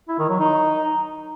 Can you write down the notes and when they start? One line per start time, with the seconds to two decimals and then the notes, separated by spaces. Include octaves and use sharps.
0.09 E4
0.19 D#3
0.29 F#3
0.40 D#4